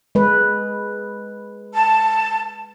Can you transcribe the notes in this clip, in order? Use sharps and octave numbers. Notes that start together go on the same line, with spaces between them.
G#3 B4
A5